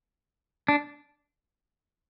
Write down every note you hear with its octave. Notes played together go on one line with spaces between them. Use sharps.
D4